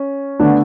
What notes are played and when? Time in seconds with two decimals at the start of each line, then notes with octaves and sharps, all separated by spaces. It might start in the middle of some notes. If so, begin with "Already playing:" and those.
Already playing: C#4
0.40 D3 A3 B3 D4